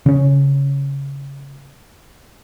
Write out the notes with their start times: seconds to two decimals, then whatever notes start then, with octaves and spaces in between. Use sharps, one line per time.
0.06 C#3 C#4